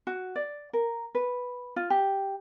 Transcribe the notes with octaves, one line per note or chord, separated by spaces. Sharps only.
F#4
D5
A#4
B4
F4
G4